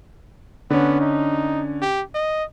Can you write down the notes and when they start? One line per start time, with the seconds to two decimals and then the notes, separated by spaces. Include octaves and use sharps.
0.70 D3 B3 C#4
1.01 D#4
1.82 G4
2.15 D#5